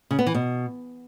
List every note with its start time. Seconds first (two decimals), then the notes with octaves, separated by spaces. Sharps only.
0.11 C#3
0.19 B3
0.27 E3
0.35 B2